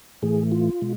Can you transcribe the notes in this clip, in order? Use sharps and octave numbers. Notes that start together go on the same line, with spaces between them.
A2 E3 A3 G#4
F4
B2 G#3